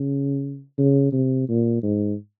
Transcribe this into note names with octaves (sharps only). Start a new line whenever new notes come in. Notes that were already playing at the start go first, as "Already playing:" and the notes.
Already playing: C#3
C#3
C3
A#2
G#2